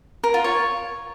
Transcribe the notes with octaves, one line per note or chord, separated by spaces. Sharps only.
A#4
F4
C#5